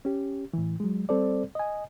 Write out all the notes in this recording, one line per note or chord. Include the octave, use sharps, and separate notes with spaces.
C#4 G4
A2 E3
F#3 G#3
G3 C4 A4 C5 D5
D#5 G#5